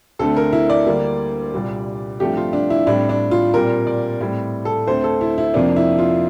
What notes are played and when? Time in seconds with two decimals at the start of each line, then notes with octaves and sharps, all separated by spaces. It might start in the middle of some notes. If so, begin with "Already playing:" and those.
0.19 D2 D3 A3 C4 A4
0.36 A#4
0.53 E4
0.70 D5
0.86 D2 D3 G3 A#3
1.53 C2 A#2 G3
2.20 G2 F3 A3 C4 G4
2.37 F4
2.53 D4
2.70 E4
2.87 A2 G3 C4 D4
3.09 D4
3.31 F4
3.54 A#2 G3 C4 A#4
3.87 D5
4.21 A2 G3 C4
4.65 A4
4.87 D2 D3 A3 C4 C5
5.04 A4
5.21 E4
5.38 E4
5.54 F2 C3 F3 A#3 D4
5.76 E4
5.98 F4